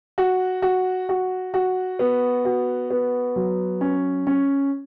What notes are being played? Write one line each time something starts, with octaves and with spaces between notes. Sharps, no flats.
F#4
F#4
F#4
F#4
B3
F#4
B3
F#3
C#4
C#4